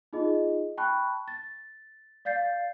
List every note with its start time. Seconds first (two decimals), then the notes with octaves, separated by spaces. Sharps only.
0.13 D#4 F4 G#4 D#5
0.78 G5 A5 B5 C#6 F#6
1.28 A6
2.25 D5 F5 G6 A6 C7